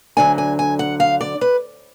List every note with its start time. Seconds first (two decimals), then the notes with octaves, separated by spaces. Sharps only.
0.17 D2 D3 F#3 G#5
0.38 G#5
0.59 G#5
0.79 F#5
1.00 F5
1.21 D5
1.41 B4